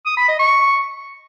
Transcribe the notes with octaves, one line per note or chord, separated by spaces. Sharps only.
D#6
B5
D#5
C#6